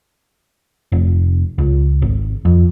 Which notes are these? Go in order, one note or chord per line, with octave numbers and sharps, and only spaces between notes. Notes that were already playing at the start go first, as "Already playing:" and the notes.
F1
C#2
G#1
F2